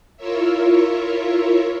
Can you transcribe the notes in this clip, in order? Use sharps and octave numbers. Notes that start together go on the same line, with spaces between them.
E4 F4 A#4 C#5 E5